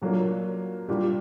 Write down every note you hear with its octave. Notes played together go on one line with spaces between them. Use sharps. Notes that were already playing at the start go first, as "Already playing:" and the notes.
A#2 F#3 A#3 D4
A#2 G3 D4 G4